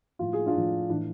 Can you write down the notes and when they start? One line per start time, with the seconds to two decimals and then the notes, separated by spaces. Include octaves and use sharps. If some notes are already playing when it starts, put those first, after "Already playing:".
0.19 A2 F3 F4
0.33 G#4
0.46 D4 F4
0.55 A2 F3
0.89 A2 E3 D4